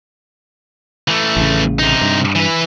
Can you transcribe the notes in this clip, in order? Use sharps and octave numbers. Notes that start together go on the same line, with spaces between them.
E3 A3
A1 C#3
C3 D#4
G2
E3 B4